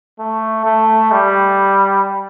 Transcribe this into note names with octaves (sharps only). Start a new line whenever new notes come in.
A3
A3
G3